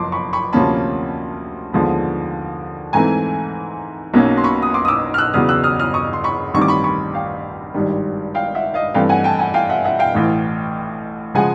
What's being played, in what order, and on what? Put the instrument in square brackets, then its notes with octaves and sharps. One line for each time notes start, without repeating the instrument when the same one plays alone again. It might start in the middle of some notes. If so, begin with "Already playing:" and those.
Already playing: [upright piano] F#1 F2 F3 C6 D6
B5 C#6
B5 C#6
D2 C3 F3 A#3 C#4 A5 B5
D#2 D3 F3 G#3 B3
G#2 E3 A3 C4 G#5 A#5
B1 B2 F#3 A#3 C#4
C6
B5 C#6
D#6
C6 D6
D#6
D6 E6
F6
E6 F#6
E2 C#3 F#3 B3 D#6 F6
E6 F#6
D#6 F6
D#6 F6
C#6 D#6
C6
B5 C#6
A1 G2 D#3 G3 C4 C#6
D6
B5 C#6
B5 C#6
F5 G5
G#1 G2 D#3 G3
F5 G5
E5 F#5
D#5 F5
G2 E3 A3 C4 F5 G5
F#5 G#5
G5 A5
F#5 G#5
F5 G5
E5 F#5
E5 F#5
F5 G5
A1 A2 E3
C#3 F3 G#3 F#5 G#5